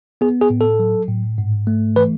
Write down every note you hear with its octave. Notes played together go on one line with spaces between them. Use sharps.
B3 G#4
G#4
A2
A4
F#3
A2
G#2
A3
E3 B4